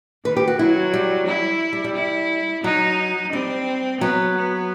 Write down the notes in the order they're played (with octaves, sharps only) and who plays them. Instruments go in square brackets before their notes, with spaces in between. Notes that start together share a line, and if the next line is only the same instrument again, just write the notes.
[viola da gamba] D#3 [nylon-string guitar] B4
[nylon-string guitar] G4
F#4
[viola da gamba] F#3 [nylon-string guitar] E4
[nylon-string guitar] G3
[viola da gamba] E4
[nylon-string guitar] G3
G3
[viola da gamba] E4
[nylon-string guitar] F#3 [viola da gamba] D#4
[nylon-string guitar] G3 [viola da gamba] C4
[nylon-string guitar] F#3 [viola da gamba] B3
[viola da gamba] B3